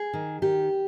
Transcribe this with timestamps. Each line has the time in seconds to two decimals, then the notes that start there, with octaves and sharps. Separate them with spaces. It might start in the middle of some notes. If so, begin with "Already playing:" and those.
Already playing: G#4
0.13 D#3
0.42 D#3 G4